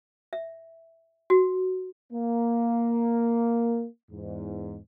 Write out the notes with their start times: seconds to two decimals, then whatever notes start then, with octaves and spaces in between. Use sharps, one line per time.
0.33 E5
1.30 F#4
2.13 A#3
4.11 E2 G#2